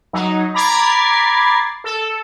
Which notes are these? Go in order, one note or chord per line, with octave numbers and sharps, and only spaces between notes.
F#3 D#4
A#5 B5 D6 G#6 A6 C7
A4